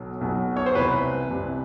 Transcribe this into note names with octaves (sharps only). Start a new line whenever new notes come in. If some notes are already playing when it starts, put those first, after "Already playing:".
Already playing: B1 B2 F#3
B1 B2 F#3
C#5
C5
C2 C3 E3 B4
C2 C3 E3